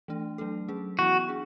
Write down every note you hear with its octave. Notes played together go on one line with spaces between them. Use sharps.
E3 A3 D4
F#3 A3 D4 A4
F#3 C#4 G#4
E3 B3 E4 F#4
D4 G#4